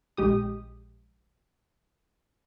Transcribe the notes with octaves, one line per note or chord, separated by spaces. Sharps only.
A#1 G#3 G4 D#6